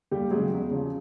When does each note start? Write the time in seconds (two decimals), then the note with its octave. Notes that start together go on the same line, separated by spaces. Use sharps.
0.11 D#2 G3 G4
0.31 C#3 F#3 G#3 G#4
0.51 E2
0.70 C#3 F3